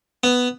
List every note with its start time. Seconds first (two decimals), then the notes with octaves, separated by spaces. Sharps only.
0.24 B3